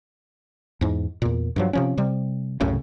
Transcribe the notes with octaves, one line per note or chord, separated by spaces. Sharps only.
E2 G#2
E2 A#2
G2 F3 F#3
C3 F3 C#4
C3 G3
C2 F#2 A2 C#3